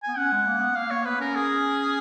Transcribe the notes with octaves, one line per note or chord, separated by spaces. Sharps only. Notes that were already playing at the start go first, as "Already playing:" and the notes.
B3 G#5
C#4 F#5
G#3
A#3
B3
A#3 F5
A#3 C#5
B3 B4
C#4 A#4
G#4